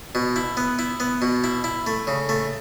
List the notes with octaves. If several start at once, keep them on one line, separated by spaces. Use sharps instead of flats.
B2
E4
B3
E4
B3
B2
E4
E4
A3
C#3
A3